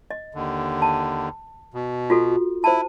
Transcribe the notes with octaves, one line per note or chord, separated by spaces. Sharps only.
D#5
D#2 D3
A5
B2
F4 F#4 A4
E4 C5 A5